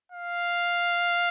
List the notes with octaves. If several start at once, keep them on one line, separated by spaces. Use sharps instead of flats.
F5